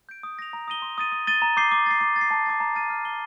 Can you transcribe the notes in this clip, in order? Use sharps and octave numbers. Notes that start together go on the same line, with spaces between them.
G6 D7
D#6
A#6 F7
A#5
D#6 A#6 D#7 G7
C6
D#6 A6 D#7
D#6
A6 D#7 G7
A#5
D6 G6 C7 G7
D6
A6 C7
D6
A6
C7
A5
D6 A6
A#5
F6 A6 D#7
F6
C7 G7